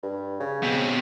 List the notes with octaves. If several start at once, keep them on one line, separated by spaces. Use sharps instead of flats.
G2
C#3
B2 C4